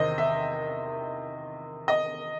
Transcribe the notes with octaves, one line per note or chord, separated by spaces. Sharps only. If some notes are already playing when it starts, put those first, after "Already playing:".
Already playing: E2 C3 D#3 C5 D#5
E5
D#5